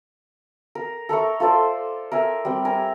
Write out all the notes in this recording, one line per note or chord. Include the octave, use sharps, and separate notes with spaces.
A#4
A4 A#4 E5 C#6
F4 A4 C5 D5
A#4 E5 G#5
G3 C4
A#4 G#5